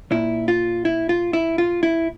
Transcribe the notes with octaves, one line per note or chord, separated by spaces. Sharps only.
A#2 E4
F4
E4
F4
E4
F4
E4